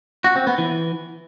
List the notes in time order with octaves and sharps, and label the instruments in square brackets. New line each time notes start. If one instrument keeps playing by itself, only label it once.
[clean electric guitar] F#4
C4
B3
E3